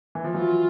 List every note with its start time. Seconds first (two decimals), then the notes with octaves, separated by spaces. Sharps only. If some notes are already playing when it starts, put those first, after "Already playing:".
0.15 E3
0.24 F3
0.34 E3 F#3 F4